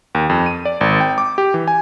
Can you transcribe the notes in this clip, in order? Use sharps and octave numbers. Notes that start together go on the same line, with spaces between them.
D#2
F2
D#7
D5
G#1
G5
D6
G4
E3
G#5